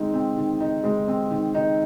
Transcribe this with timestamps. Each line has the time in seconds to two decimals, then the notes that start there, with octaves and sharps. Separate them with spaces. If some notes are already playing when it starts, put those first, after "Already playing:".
Already playing: D#3 G#3 C4 D#4
0.14 C4
0.37 D#3
0.60 D#4
0.84 G#3
1.08 C4
1.31 D#3
1.54 D#4